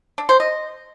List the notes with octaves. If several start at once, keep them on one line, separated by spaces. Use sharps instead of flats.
D4
C5
D#5